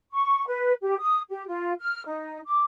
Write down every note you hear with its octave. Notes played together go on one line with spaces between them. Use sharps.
C#6
B4
G4
D#6
G4
F4
F6
D#4
D6